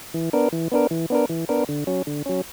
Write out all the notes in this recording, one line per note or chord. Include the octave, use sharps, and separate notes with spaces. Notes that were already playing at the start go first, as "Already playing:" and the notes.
E3
B3 D4 A#4
E3
B3 D4 A#4
E3
B3 D4 A#4
E3
B3 D4 A#4
D3
F#3 C#4
D3
F#3 C#4